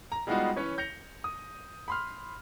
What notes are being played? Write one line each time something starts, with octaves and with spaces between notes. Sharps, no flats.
A#5
G3 G#3 B3 D#4 F4 F#4
E3 C#4 B4 C#5
G6 A#6 C#7 F7
D#6
B5 C6 F6